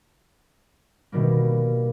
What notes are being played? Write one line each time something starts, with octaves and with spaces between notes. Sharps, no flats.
B2 D#3 G3 A#3